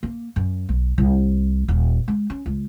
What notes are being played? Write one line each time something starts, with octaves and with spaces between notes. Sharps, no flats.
A#3
F#2
B1
C2
D#1
G#3
C#4
C#2